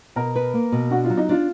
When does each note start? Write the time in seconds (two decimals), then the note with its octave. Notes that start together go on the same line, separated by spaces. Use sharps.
0.16 B2 A#4
0.35 B4
0.54 A#3
0.72 B2
0.91 D4 F#4
1.05 F4
1.10 F#3
1.17 D#4
1.29 D4 F4